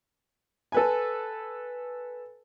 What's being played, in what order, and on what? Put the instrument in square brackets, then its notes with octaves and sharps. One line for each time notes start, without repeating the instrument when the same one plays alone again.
[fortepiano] A4 B4 G#5